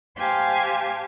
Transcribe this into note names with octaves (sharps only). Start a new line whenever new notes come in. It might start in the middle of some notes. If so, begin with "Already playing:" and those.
G4 C5 F5 G#5 A5